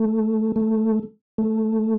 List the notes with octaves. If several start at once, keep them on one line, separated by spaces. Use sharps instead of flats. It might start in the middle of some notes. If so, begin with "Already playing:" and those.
Already playing: A3
A3
A3